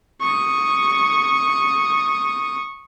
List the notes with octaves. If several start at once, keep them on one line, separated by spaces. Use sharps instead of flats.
C#6 D#6